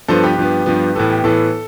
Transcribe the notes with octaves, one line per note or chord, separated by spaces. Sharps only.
G2 F3 B3 A4 C5
G4 B4
G2 F3 B3
G2 F3 B3
A2 E3 B3 A4
G4
A2 E3 B3 A4